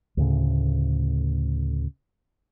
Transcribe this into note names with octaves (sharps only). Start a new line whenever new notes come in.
D2 A2 C#3